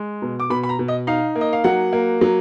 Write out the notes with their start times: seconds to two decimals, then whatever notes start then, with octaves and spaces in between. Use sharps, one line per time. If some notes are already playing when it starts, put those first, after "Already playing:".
Already playing: G#3
0.22 B2
0.40 D6
0.50 B2 B5
0.63 B5
0.69 A#5
0.79 B2
0.88 D#5
1.07 D#4 F5
1.36 A#3
1.41 D#5
1.53 F5
1.64 F#3 F#5
1.93 A#3
2.21 F#3